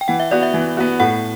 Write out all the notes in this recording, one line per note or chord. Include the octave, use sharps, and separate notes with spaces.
G5
E3 F#5
E5
B3 F#4 D5
E5
E3
B3 F#4
A2 F#5